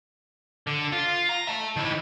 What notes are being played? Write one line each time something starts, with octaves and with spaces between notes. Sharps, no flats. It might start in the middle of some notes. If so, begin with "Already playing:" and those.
D3
F4
A#5
E5 A5
D#3 E4